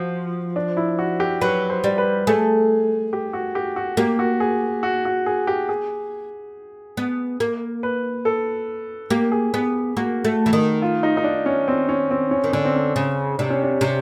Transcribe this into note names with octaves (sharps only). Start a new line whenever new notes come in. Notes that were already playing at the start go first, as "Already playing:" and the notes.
Already playing: F3 F#4
D4
E4
F#4
G4
F#3 B4
C5
G3
B4
A3 G#4
G4
F#4
G4
F#4
A#3 G4
F#4
G#4
F#4
F#4
G#4
G4
G#4
B3
A#3
B4
A4
A#3 G4
G#4
B3 G#4
A#3 F#4
A3
E3
D#3
F4
D#4
D#4
D4
C#4
C4
C#4
C4
C#4
D#3
D3 C#4
C4
C#4
C#3
C3 D4
C#4
D4
C3